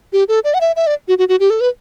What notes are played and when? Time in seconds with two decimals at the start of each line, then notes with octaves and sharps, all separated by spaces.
0.13 G4
0.28 A4
0.44 D5
0.54 F#5
0.61 E5
0.76 E5
0.87 D5
1.08 F#4
1.18 F#4
1.29 F#4
1.40 G4
1.50 A4
1.61 B4